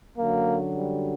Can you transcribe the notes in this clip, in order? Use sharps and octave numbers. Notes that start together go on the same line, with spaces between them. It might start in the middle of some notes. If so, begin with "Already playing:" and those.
F#2 D3 F#3 A#3
G3